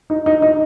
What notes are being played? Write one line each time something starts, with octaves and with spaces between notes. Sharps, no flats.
D#4
D#4
D#4